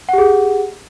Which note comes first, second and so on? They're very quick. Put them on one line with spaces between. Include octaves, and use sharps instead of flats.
F#5 G4 G#4